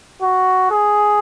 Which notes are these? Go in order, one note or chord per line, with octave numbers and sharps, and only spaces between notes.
F#4
G#4